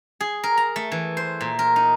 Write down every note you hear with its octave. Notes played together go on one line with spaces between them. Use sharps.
G#4
A#4
A#5
A3
E3
C5
A#2
A#4
D#4